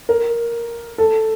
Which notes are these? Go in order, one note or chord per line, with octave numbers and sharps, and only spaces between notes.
A#4
A4